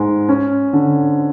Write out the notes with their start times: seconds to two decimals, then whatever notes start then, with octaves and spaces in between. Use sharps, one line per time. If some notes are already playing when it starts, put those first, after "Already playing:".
Already playing: G#2 G#3
0.29 C#4
0.73 D3